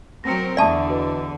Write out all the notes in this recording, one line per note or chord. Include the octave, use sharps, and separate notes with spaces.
F#3 C4 A#4 A#6 C#7
E2 D3 D5 E5 A5 C#6 D#6
F#4 B4 D#5